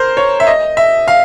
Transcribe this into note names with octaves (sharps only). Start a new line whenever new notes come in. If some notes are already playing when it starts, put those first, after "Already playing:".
Already playing: A#4 C5
C#5
E5
D#5
E5
F5